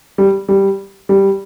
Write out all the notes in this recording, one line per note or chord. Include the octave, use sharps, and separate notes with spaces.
G3
G3
G3